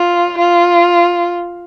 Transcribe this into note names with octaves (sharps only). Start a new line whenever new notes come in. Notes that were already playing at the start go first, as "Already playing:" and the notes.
Already playing: F4
F4